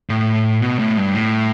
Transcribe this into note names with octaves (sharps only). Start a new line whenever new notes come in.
A2
B2
A2
G2
A2